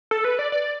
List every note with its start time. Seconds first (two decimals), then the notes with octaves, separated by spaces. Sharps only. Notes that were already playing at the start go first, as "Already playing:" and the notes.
0.11 A4
0.24 B4
0.39 D5
0.52 D5